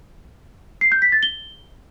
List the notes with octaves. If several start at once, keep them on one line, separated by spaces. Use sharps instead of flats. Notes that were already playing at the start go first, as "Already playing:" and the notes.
C7
G6
B6
A6
G7